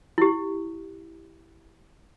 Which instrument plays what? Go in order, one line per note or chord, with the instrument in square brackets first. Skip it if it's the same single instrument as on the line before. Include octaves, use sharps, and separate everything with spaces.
[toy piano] E4 G4